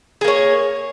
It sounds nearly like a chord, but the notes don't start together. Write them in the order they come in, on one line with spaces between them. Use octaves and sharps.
G#4 A#3 C#5